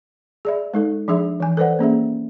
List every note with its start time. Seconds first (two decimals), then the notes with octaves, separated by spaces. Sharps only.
0.45 G#4 D5 E5
0.74 G#3 D#4 A4
1.08 F3 D4 G#4 E5
1.40 E3 G#5
1.57 A4 B4 C5 D5 F#5
1.79 A#3 C#4 G#4 E5